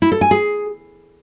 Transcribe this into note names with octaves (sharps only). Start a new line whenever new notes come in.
E4
A4
G#5
G#4